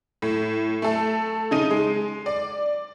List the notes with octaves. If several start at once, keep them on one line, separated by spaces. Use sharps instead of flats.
A2
A3 A4
C#3 D#4 D#7
G#3
D5